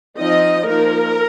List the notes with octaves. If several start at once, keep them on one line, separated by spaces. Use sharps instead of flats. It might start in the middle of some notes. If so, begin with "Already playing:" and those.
F3 C4 D#4 D#5
F3 A#3 D#4 A#4